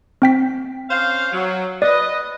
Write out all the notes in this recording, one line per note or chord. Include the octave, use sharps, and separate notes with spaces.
C4 G5 B6
C#4 C5 F5
F#3
B4 D5 D#5